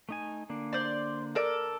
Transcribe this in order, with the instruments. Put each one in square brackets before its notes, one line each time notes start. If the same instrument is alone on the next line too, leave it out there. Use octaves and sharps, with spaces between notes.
[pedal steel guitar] A3 D#4 G#5
D3 A#3 D4
[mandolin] C5 D5
A4 A#4 D5